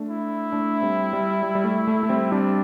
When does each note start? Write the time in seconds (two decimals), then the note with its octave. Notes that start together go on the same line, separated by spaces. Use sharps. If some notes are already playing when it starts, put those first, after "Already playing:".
Already playing: A3 D4
0.09 E4
0.52 A3 D4
0.82 G3 C4
1.13 G3
1.43 G3
1.55 G3
1.64 A3
1.87 A3
2.03 A3
2.09 G3 C4
2.32 G3 C4 D4